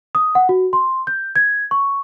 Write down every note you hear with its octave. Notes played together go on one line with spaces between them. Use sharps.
D#6
F#5
F#4
C6
G6
G#6
C#6